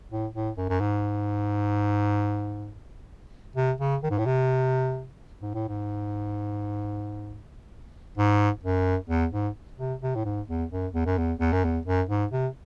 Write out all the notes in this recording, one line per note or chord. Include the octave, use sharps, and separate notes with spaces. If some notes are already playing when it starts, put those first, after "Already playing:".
A2
A2
F#2
F#2
G#2
C3
C#3
D#3
G#2
A2
C3
G#2
A2
G#2
G#2
F#2
E2
G#2
C3
C3
A2
G#2
E2
F#2
E2
F#2
E2
E2
F#2
E2
F#2
G#2
C3